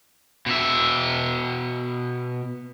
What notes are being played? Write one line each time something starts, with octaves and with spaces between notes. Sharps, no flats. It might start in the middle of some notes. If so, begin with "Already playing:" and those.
B2 E5